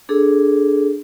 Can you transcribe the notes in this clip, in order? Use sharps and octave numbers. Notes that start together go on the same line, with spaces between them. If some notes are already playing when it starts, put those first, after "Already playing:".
D4 G#4 A4